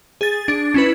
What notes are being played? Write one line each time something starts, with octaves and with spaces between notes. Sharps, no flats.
G#4 A6
D4
C#4 E4 B4